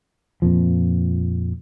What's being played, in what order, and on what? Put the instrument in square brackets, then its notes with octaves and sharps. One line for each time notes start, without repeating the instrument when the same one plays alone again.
[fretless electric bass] F2 A#2 F3